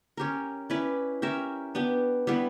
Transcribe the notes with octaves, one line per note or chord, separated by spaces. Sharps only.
C#4 G4 A#4
C#4 E4 B4 D5
C#4 G4 A#4 E5
B3 D4 G4
G3 B3 E4 B4